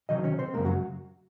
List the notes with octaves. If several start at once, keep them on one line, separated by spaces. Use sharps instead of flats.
C3 D#3 F#3 D#4 D#5
C#4 C#5
C4 C5
F#2 C#3 G#3 A#3 A#4
F#3 F#4